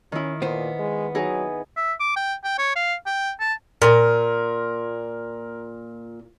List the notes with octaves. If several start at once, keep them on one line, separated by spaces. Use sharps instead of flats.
D#3 C#4 E4
A#2 B3 C5
G#3
F#3 D#4 E4 G#4
E5
D6
G5
G5
C#5
F5
G5
A5
A#2 A#4